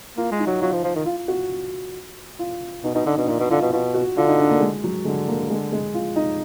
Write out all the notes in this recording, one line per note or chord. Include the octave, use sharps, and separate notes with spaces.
A#3 F4
G#3
D#4
F#3
F#3 F4
F3
F3
D#3
F4
F#4
F4
B2 D#4
B2 D#4
D3 D#4
B2 D4
A#2 D#4
B2
D3 F4
B2
B2 F4
F#4
D3 F4
D#4
D4
A#3
G#3
F#3
D3 G#3
A#3
G#3
G#3
F4
D#4